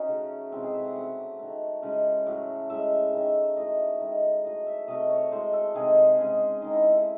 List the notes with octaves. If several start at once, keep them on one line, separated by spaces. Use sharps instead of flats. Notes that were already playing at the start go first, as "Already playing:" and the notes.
Already playing: C#4 D#4 F#4
C#3 F#3 A3
C3 E3 G#3 C4
G#4
E5
F#5
C#3 F#3 A3 F#5
D#3 A3
C#3 E3 G#3
A2 F#3 A3
A2 G#3 E5
D#3 A3
A2 F#3 A3 D#5
D#3 G#3
A2 F#3 A3 D#5
E5
C3 F#3 A3 D#5
C#5
A2 G#3 C5
A4
C3 D#3 G#3 G#4
C#3 G#3
D#3 G#3 D#4
E4
E4
A4